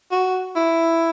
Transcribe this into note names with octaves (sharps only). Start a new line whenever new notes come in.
F#4
E4